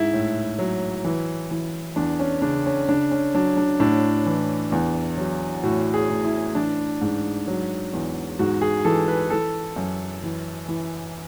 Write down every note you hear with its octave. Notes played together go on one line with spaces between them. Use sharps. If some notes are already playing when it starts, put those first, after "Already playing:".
Already playing: G#2 E4
A2
F#3
E3
E3
E2 D4
C#4
C#3 D4
C#4
C#3 D4
C#4
F#3 D4
D4
A2 D4
E3
E2
F#3
A2 F#4
G#4
A2
E4
E3 D4
G#2
F#3
E2
G#2 F#4
G#4
E3 A4
B4
E3 A4
F#2
E3
E3